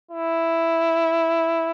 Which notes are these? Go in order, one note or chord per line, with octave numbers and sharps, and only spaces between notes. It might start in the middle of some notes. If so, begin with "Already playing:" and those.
E4